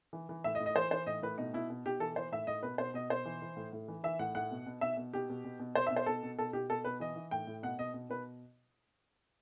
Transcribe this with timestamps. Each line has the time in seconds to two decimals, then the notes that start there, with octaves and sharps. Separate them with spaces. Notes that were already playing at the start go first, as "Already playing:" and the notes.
0.13 E3
0.29 E3
0.44 A2 E5
0.55 D#5
0.60 A2
0.66 D#5
0.76 E3 C5
0.91 E3 C5
1.06 A2 D#5
1.22 A2 B4
1.38 B2 D#4
1.54 B2 E4
1.70 B2
1.86 B2 G4
2.00 E3 A4
2.16 E3 C5
2.32 A2 E5
2.47 A2 D#5
2.63 B2 B4
2.78 B2 C5
2.94 B2 D#5
3.10 B2 C5
3.25 E3
3.42 E3
3.56 A2
3.73 A2
3.88 E3
4.04 E3 E5
4.19 A2 F#5
4.35 A2 F#5
4.51 B2
4.66 B2
4.81 B2 E5
4.97 B2
5.13 B2 G4
5.29 B2
5.45 B2
5.60 B2
5.75 B2 C5
5.87 E5
5.91 B2
5.96 C5
6.06 B2 A4
6.23 B2
6.38 B2 A4
6.53 B2 G4
6.70 B2 A4
6.85 B2 B4
7.00 E3 D#5
7.16 E3
7.31 A2 G5
7.47 A2
7.63 B2 F#5
7.78 B2 D#5
7.94 B2
8.10 B2 B4